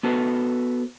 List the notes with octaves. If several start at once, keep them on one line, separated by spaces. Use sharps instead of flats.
B3 F#4 A4 B4 C5